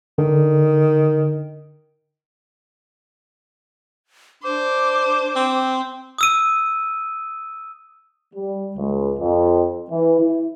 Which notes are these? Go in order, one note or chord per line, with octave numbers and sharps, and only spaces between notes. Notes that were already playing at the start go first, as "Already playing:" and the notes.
D3 D#3
D4 C5 D6
C4
D#6 E6 D#7
G3
C#2
F2
E3
E4